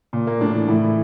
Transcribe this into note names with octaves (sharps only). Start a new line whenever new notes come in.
A#2
A#3
A2 D4
E3
A2 E4
E3